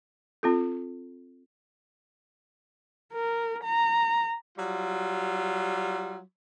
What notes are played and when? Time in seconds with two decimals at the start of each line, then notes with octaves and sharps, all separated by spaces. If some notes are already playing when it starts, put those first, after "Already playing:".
0.43 C4 F4 A4
3.13 A#4
3.64 A#5
4.58 F#3 G3 F4